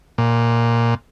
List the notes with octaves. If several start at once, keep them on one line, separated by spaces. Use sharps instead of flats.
A#2